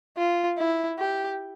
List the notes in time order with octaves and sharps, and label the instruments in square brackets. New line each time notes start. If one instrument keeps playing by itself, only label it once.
[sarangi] F4
E4
G4